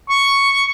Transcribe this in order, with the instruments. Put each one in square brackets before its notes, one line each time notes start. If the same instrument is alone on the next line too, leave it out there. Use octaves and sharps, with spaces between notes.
[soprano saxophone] C#6